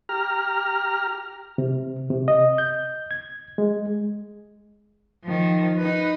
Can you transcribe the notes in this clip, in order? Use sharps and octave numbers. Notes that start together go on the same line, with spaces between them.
G4 A#5 F6
C3
C3
D#5
G6
G#6
G#3
D#3 F3
D#4 B4